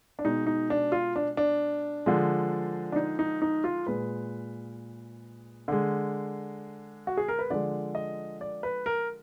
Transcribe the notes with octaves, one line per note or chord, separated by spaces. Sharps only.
D4
B2 G#3 D#4
D#4
D4
F4
D4
D4
D3 F3 G#3
D4
D#4
D#4
D#4
F4
A#2 G#3 B4
D3 G#3
F#4
G#4
A#4
B4
D3 F3 G#3 D5
D#5
D5
B4
A#4